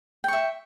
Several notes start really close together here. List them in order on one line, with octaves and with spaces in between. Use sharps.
G5 C#6 E5